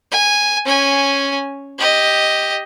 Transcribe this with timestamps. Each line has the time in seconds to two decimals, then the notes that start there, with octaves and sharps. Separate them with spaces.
0.11 G#5
0.65 C#4 G#5
1.79 G4 D#5